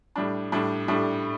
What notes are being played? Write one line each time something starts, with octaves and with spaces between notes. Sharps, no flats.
A2 G3 D4
A2 G3 D4
A2 G3 D4